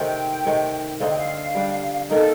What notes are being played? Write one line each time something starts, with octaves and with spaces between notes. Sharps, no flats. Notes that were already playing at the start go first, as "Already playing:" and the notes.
Already playing: C3 D#3 A3 C4 G5
C3 D#3 A3
D3 A3 C4 D#4 F5
G5
F5
G3 D4 G4
D#3 A#3 D#4 A4